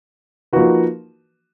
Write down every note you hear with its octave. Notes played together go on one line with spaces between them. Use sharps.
F3 A#3 D#4 F#4 B4